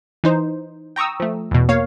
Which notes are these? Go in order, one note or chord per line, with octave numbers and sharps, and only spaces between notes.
E3 D#4 C5
G5 A#5 C#6 D#6 E6
F3 A3
E2 B2
A#3 C#5 F5